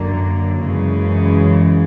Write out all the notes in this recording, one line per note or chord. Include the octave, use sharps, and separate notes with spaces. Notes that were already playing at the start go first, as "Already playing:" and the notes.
Already playing: F#2 D3 F#3 A#3
F#2 C#3 E3 G#3